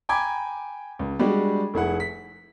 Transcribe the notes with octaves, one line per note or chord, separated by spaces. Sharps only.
G5 G#5 A#5 B5 D6 G#6
C#2
G3 G#3 D4 F#4 G4
F1 E4 G#4 F#5
B6